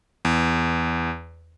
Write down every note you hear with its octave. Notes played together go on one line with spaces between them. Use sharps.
E2